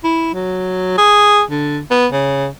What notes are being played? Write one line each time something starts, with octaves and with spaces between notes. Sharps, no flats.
E4
F#3
G#4
D3
B3
C#3